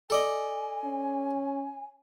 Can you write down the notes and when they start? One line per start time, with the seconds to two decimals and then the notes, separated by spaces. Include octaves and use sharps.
0.10 A4 D5 D#5 G#5
0.84 C#4